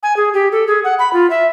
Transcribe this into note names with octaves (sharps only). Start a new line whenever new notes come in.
G#5
G#4
G4
A4
G#4
F#5
B5
F4
E5